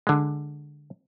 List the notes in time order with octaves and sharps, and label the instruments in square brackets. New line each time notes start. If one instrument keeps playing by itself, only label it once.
[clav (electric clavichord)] D3 G#3